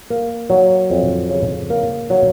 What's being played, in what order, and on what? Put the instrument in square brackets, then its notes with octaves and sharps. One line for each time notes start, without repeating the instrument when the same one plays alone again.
[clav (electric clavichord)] A#3
F#3
F2
C#3
A#3
F#3